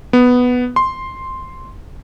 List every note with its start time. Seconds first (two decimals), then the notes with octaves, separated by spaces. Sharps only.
0.13 B3
0.76 C6